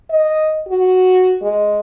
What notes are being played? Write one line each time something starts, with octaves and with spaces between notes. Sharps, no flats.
D#5
F#4
G#3